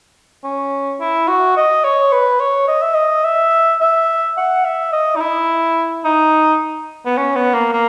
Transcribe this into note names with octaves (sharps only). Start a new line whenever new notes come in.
C#4
E4
F#4
D#5
C#5
B4
C#5
D#5
E5
D#5
E5
E5
F#5
E5
D#5
D#4
E4
D#4
B3
C#4
B3
A#3
A#3